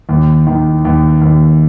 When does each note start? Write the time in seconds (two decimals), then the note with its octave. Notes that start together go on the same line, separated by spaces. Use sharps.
0.09 D#2
0.47 D#3
0.85 D#2
1.22 D#2